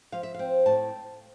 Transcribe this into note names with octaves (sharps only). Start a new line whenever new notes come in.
F3 F5
E5
C4 F5
A2 A5